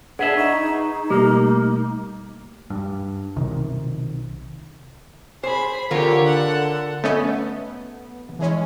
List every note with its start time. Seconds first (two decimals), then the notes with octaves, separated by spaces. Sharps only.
0.19 D4 G#4 B4 E5 F#5
0.37 D#4 D#5 C#6
1.10 B2 G3 A3 A#3 G4
2.70 G2
3.36 B1 C3 D#3
5.43 G#4 C5 B5
5.91 D3 F4 G4 A#4 C#5
6.26 A4 F#5
7.04 A3 B3 C#4 D#5
8.39 E3 G#3 C#4